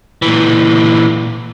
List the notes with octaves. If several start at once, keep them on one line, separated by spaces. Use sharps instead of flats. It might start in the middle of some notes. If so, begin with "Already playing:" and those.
A#2 E3